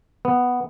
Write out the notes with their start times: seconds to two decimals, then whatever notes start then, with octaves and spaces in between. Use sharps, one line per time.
0.25 B3